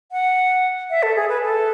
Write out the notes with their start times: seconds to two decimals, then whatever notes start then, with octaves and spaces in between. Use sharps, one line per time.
0.12 F#5
0.90 E5
1.03 A4
1.16 G#4
1.29 B4
1.42 A4